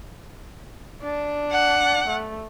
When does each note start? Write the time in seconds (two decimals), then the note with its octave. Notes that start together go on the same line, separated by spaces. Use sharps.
1.03 D4
1.52 F#5
2.08 A3